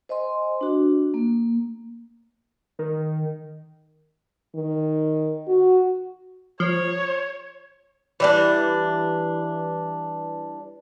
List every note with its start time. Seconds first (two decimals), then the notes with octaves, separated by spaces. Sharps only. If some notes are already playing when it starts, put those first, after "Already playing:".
0.09 C5 D#5 G#5 C6
0.61 D4 F#4
1.14 A#3
2.79 D#3
4.55 D#3
5.48 F#4
6.60 F3 C#5
8.20 E3 G3 D4